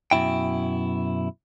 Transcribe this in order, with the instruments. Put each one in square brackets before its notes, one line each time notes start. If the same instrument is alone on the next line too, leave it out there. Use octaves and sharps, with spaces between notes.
[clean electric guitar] F#2 B2 E4 G5